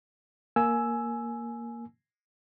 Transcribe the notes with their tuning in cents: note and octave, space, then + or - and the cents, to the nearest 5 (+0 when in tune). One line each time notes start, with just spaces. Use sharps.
A#3 +0 G#5 +15 E6 +0